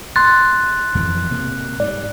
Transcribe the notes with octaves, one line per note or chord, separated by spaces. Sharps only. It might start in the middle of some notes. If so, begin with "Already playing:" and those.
C6 F#6 A6
F2 E3
C3 A#3
G#2 G3 D5